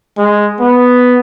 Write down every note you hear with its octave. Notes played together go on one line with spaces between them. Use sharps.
G#3
B3